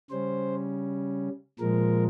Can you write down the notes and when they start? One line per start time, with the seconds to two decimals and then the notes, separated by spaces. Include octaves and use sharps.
0.11 C#3 G3 C#4 C5
1.59 A#2 F3 G#3 A#4